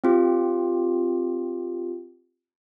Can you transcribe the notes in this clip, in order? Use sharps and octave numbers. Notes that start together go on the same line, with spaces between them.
C4 F4 G4